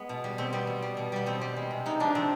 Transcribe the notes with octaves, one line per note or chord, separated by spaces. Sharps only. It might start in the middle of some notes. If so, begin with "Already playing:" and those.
Already playing: G#3 B3
B2
G3
B2 C4
G3 B3
B2
G3
B2
G3 B3
B2 C4
G3
G#3
C3
C3 D#4
F3 D4
C3 C4